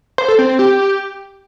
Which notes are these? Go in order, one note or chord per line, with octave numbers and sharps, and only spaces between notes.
C5
A4
C4
C4
G4